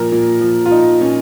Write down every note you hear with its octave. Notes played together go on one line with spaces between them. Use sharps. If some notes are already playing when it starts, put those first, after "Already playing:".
Already playing: A#2 F3 A#4
A#2
F3
F4
F3 D#4
A#2 C#4